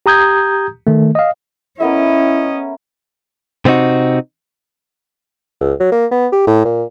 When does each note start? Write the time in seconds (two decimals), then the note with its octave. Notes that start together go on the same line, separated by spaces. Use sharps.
0.06 G4 A#5 D#6 G6 G#6
0.87 D#3 A3
1.15 D#5 F5
1.80 A3 B3 C#4 E4 A#4 D#5
3.65 C3 B3 C4 D#4 F#4
5.61 C#2
5.80 F#3
5.92 A#3
6.11 B3
6.32 G4
6.47 A2
6.65 A#2